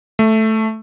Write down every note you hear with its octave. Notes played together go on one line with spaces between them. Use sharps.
A3